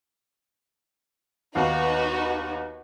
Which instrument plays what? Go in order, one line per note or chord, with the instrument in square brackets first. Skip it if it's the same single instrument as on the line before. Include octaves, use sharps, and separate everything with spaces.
[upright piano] D#2 B3 F5 [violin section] D#4 F#4 B4